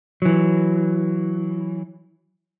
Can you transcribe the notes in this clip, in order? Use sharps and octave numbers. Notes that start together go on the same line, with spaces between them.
E3 F#3